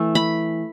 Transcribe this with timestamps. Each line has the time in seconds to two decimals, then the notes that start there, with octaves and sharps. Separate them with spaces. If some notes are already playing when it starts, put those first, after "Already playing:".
Already playing: E3 A3
0.15 B5